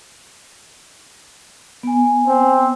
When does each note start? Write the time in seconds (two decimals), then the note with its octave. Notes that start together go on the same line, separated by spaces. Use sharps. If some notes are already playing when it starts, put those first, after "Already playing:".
1.83 B3 G#5
2.27 C4